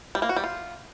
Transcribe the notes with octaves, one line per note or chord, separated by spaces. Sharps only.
G3
A#3
F#4
G3
F4